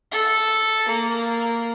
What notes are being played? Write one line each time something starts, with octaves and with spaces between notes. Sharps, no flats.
A4
A#3